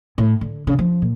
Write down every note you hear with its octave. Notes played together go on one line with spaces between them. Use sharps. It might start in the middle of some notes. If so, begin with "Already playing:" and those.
A2
D3
C#3
F3
A#2